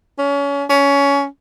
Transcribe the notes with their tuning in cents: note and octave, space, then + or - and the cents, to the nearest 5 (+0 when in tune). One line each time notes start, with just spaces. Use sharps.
C#4 +30
C#4 +20